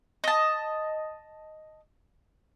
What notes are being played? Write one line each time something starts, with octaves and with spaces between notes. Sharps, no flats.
D#5 A5